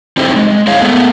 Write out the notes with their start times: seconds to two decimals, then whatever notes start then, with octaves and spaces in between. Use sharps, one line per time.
0.17 C4 D#4 E4 G4 A4 C5
0.36 G#3
0.67 E4 G#4 C#5 F5
0.82 A3 B3